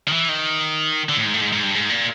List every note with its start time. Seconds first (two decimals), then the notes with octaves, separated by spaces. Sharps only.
0.08 D#3
0.12 E3
0.29 D#3
1.09 D3
1.17 A2
1.25 G#2
1.34 A2
1.41 G#2
1.52 G#2
1.63 G2
1.75 G#2
1.90 A#2